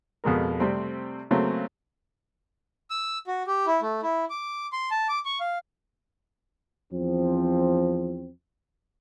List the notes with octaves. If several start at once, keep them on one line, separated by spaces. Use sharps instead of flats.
F2 B2 G#3 A#4
C3 G3 A3 C4
C#3 F#3 A3 A#3 C4
E6
F#4
G4
E4
A3
E4
D6
C6
A5
D6
C#6
F5
E2 F3 C4